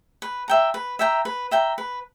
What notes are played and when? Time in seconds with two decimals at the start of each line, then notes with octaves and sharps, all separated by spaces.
0.22 B4
0.48 E5 G5 A#5
0.74 B4
0.99 E5 G5 A#5
1.25 B4
1.51 E5 G5 A#5
1.78 B4